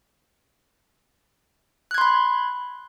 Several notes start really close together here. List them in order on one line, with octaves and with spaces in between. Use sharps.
F#6 G#6 C6 B5